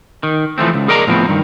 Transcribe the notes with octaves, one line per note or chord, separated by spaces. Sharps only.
D#3
E3 F3 A3 C4
C#2
G#4 A#4 D5 D#5 A#5
A2 F3 B3 C4
G2 D#3